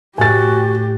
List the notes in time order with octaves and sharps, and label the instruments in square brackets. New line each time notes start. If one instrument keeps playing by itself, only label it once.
[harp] A2 [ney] F#4 [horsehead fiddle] G4 [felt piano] G#5 A6